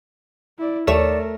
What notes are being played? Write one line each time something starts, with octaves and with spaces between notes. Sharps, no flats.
E4 D5
D#2 A3 A#4 C#5 D5 E7